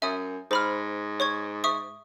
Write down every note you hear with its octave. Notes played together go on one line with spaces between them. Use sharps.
F#2 E5 G#5 D#6
G#2 C5 B5 F6
C#5 C#6 G#6
E5 C#6 D#6